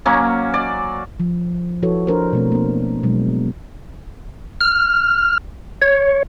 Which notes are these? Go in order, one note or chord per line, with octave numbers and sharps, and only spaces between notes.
F#3 A#3 C#4
D5
F3
F3 E4 F#4 A4 B4 C#5
D4 A#4 C5
B2 A3 C4
A#3 D4
B2 F#3 G#3 D4
F6
C#5